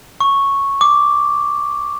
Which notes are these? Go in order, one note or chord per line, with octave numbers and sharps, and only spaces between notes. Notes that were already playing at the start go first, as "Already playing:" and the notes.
C#6
D6